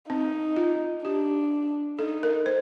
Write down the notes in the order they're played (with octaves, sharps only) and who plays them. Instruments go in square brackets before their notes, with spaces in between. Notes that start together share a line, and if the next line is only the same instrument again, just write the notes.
[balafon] C4 [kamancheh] D#4
[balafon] F4
[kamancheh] D4 [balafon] G4
[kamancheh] D#4 [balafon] A4
[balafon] A#4
C5